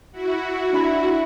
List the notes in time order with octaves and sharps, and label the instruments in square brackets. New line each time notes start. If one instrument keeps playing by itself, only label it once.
[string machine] E4 F#4
[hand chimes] D4 E5 B5